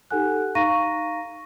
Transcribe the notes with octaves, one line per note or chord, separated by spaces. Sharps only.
D#4 G4 A4 F#5 G#5 F#6
D#4 F5 A#5 C#6 A#6 D#7